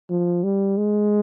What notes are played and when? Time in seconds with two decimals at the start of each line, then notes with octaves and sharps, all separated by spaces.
0.10 F3
0.44 G3
0.78 G#3